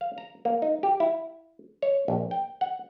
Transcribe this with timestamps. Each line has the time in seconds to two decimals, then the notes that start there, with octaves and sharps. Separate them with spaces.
0.01 F5
0.18 A#5
0.45 A#3
0.62 D#4
0.83 G4
1.00 E4
1.82 C#5
2.08 A#1
2.31 G5
2.61 F#5